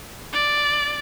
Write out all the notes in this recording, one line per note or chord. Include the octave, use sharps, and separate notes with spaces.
D5